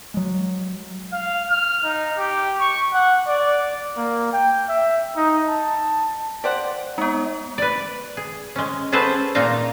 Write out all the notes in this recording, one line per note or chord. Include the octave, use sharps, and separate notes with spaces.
F#3 G#3
F5
F6
D#4
G4
C#6
F#5
D5
A#3
G5
E5
D#4
A5
G4 C5 D5 F#5
G#3 B3 D#4
B4 D5
G#4
G#3 C#4
C#4 G#4 A4 B4 C5 F#5
A#2 A#3 D#4 F4 F5 A#5